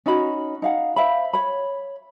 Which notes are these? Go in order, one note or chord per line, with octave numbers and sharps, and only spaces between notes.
C#4 D#4 F#4 B5
D#4 F5 F#5
C5 E5 F5 B5
C#5 B5